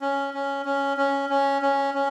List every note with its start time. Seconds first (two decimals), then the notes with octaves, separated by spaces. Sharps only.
0.01 C#4
0.34 C#4
0.65 C#4
0.97 C#4
1.29 C#4
1.62 C#4
1.94 C#4